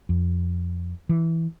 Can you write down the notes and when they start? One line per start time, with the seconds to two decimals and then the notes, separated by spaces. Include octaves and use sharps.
0.09 F2
1.09 E3